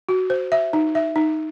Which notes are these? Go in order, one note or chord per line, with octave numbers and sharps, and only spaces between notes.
F#4
C5
E5
D#4
E5
D#4